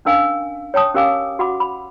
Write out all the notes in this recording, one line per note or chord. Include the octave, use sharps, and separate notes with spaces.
C#4 D4 A#4 F5 G#5 E6
C#5 G5 A5 D#6
C#4 G4 A#4 F5 G#5 D6
F#4 F#5 B5 D6
B5